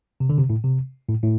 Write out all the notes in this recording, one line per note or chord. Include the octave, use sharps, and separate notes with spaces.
C3
D3
C3
A2
C3
A2
A2